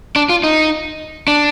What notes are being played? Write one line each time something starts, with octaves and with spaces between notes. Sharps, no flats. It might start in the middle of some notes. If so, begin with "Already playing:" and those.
D4
F4
D#4
D4